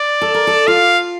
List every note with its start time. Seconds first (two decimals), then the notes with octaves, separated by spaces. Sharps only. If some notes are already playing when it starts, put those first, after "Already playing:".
Already playing: D5
0.21 A4
0.34 A#4
0.47 A4
0.67 F4 F5